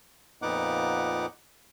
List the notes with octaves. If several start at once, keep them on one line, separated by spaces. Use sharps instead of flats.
F2 A#2 B3 D#4 F#5 D6